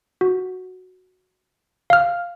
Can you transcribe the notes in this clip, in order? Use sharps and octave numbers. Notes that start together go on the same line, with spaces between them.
F#4
F5 F6